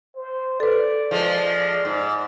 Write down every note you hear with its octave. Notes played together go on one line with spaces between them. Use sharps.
C5
A4 B4 D5
F3 G#3
G#2